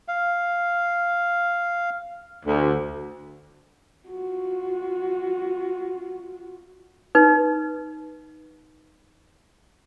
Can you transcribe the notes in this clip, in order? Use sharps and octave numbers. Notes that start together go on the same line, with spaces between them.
F5
D2
F4 F#4
D#4 B4